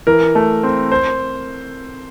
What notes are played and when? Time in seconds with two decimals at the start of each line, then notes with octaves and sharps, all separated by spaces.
0.07 E3 A#4
0.35 A3
0.63 C4
0.92 C5